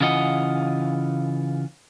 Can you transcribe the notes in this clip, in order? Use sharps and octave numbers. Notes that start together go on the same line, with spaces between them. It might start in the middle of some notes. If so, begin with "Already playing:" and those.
C#3 E3 F4 D#5 F#5